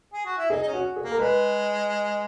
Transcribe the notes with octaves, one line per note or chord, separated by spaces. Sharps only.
G#4
F#4
E4
D#4 G#4
D#4
C#4
F#4
G#4
A#3
A#4
G#3 B4